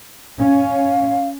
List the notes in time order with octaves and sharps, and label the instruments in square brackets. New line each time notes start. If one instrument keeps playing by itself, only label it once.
[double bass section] C#4 [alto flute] F5